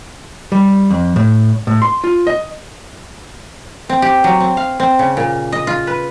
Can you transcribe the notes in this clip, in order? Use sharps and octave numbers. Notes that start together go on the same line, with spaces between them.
G3
F2
A2
A2
C6
F4
D#5
C4
G4
F#3
C4
F5
C4
C#3
A#2
D#5
F4
B4